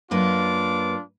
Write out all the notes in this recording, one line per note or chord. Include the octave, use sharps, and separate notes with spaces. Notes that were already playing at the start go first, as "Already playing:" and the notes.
F#2 A#3 D4 F4 B4 D6